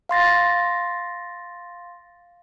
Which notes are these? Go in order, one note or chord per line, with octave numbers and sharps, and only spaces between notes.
F5 C6 A6 A#6